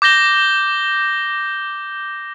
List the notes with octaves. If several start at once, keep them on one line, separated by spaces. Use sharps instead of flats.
D6 G6 A#6 G7